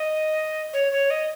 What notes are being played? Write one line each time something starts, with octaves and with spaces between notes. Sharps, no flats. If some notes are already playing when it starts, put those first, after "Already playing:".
Already playing: D#5
C#5
C#5
D#5